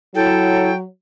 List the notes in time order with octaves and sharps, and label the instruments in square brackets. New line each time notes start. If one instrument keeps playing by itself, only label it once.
[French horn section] F#3 [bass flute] E4 [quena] A4 [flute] G5